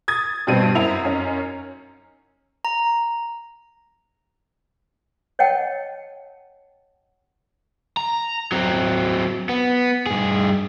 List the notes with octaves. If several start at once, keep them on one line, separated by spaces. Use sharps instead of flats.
D#6 G#6 A6
G2 B2 G3 C4 D#7
F#2 C4 E4 F7
F#2 C#4 D#4
A#5
C#5 D#5 F#5 G5 A5
A#5
F#3 C4
B3
G2 G#4